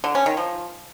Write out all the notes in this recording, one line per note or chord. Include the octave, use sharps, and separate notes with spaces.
D3
C#4
D#3
F3